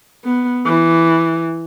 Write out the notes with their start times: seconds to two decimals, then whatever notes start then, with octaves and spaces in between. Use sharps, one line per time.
0.25 B3
0.66 E3